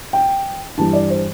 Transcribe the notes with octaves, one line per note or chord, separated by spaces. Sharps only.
G5
G2 E3 G3 A5
D5
C5